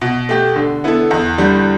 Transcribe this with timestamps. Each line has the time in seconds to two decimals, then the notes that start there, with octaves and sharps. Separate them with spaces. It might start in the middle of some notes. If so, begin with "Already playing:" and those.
0.01 B2
0.29 A3 G4
0.56 D3
0.84 B3 E4 A4
1.11 E2
1.38 D3 G3